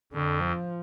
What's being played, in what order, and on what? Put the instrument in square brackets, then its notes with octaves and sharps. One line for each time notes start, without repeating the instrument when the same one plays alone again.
[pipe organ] F2 [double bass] D3
[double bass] F3